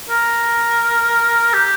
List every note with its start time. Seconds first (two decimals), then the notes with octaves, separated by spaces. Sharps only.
0.10 A#4
1.54 G4